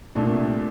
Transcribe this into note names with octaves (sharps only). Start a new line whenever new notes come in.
C2 A#2 A3 D4